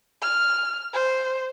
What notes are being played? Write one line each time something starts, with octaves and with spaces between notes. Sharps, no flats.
F6
C5